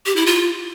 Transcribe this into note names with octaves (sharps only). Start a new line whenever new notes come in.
G4
E4
F4